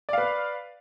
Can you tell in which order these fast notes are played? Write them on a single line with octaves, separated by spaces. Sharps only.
D5 F5 B4